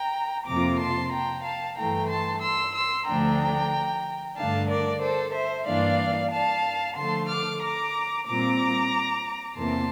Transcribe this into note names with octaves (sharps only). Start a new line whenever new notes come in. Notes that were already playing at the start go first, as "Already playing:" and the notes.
Already playing: G5 A#5
F2 C3 F3 A#3 F4 A#5 D6
A5 C6
G5 A#5
F5 A5
G2 E3 A3 G5 A#5
A5 C6
C6 E6
C6 E6
D2 D3 F3 A3 D4 G5 A#5
G2 D3 A3 D4 F5 A5
A#4 D5
A4 C5
C5 E5
G2 E3 A#3 D4 D5 F5
F5 A5
D3 F3 A3 A5 C6
D6 F6
A#5 D6
A#2 G3 C4 F4 A#5 D6
E2 C3 E3 A#3 A5 C6